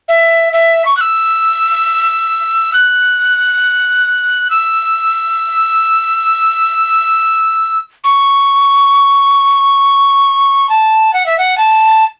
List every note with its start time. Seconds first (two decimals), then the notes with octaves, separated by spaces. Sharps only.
0.08 E5
0.53 E5
0.85 C#6
0.97 F#6
1.01 E6
2.73 F#6
4.50 E6
8.04 C#6
10.69 A5
11.13 F#5
11.26 E5
11.38 F#5
11.58 A5